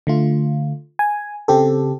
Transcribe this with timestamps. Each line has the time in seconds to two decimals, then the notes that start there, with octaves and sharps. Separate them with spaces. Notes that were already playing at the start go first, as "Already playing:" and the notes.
0.07 D3 A3 F4
0.99 G#5
1.48 C#3 C4 G4 A4